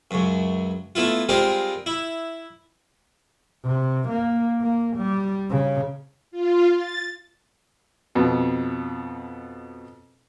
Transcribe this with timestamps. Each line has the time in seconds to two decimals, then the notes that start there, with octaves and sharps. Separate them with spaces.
0.11 C#2 F#2
0.95 A3 B3 E4 F4
1.29 G3 G#3 C4 F4 A#4
1.86 E4
3.65 C3
4.09 A#3
4.61 A#3
4.97 G3
5.50 C#3
6.31 F4
6.74 A6
8.15 F2 B2